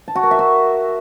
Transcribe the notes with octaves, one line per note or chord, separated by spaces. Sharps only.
A5
F#4
A#4
E5
F#4